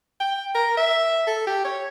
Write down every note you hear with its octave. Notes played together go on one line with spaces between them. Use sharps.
G5
A#4
E5
A4
G4
C#5